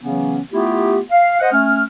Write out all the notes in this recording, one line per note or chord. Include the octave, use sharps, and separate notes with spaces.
C#3 E3 F#3 B3 C#4
A3 B3 E4 F4 G4
F5
C5 D#5 F#5
A3 C#4 F6